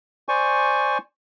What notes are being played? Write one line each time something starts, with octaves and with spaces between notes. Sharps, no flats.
C5 D5 G#5 C#6